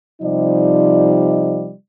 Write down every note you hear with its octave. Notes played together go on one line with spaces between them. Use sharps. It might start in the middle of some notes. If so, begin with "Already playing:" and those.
C3 F3 G3 D#4 D5 D#5